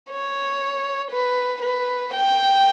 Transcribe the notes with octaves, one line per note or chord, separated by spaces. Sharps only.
C#5
B4
B4
G5